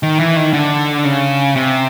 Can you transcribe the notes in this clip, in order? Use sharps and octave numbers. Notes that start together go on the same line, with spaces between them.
D#3
E3
D#3
D3
C#3
C3